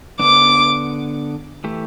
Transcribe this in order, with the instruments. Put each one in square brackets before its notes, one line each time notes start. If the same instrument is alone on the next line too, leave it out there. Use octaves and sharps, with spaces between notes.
[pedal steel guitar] D3 B3 D4 [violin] D6
[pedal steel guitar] E3 A3 G4